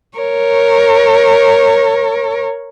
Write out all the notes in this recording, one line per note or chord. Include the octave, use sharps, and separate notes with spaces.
A#4 C#5